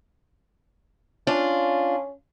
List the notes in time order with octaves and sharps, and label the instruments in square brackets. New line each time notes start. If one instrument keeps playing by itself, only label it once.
[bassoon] C#4 [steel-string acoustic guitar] D4 F4